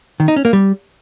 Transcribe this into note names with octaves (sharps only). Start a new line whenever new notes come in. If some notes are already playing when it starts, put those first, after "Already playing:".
D#3
D#4
C#4
A#3
G3